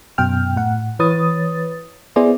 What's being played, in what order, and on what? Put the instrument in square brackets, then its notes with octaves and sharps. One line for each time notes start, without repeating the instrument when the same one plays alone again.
[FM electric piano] F#2 B2 G5 F6
A2 F#5
E3 B4 C#5 D#6 A6
B3 E4 G#4 C5 D5